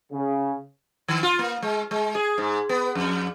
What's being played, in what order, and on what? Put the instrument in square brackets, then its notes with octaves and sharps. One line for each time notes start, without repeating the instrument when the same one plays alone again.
[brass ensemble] C#3
[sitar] D#3
F4
A#3
G#3
G#3
G#4
G#2
B3
F2